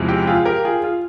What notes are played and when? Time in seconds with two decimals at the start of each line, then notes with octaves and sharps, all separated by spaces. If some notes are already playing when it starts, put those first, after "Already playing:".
Already playing: E2 C3 F3 G#3 E4
0.08 G4
0.27 F4 G#4
0.45 G4 A#4
0.65 F4 G#4
0.83 F4